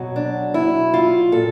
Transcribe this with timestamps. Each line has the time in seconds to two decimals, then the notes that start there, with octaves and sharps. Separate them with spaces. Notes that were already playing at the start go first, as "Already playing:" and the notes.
Already playing: B2 F#3
0.16 D4
0.54 E4
0.94 F4
1.32 A#2 A4